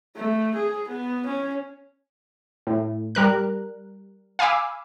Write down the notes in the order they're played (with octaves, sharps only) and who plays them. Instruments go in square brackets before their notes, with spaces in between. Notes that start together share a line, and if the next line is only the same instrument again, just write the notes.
[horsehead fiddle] A3
G#4
B3
C#4
[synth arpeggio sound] A2
G3 A#4 F#6
F5 G#5 B5 D6 E6